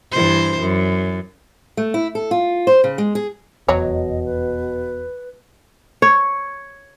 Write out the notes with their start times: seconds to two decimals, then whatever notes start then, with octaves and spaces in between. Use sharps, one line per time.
0.12 G2 E3 C5
0.60 F#2
1.77 A3
1.94 E4
2.15 A4
2.31 F4
2.67 C5
2.84 C#3
2.98 G#3
3.15 G#4
3.68 F1 E2 B2 F#3 C#5 D#5
4.25 B4
6.02 C#5